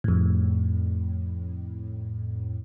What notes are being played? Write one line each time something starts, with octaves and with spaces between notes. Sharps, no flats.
F2 A2